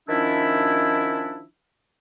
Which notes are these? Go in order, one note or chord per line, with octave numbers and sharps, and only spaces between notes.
D#3 F3 C#4 D4 E4